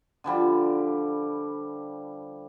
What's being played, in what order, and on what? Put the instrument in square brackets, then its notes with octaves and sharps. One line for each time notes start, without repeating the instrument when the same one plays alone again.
[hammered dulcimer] D3 F3 G3